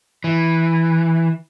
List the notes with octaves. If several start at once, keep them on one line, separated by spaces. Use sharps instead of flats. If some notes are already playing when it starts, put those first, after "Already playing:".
E3